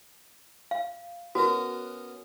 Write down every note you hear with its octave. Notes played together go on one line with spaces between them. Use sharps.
F5
B3 C#4 F#4 A#4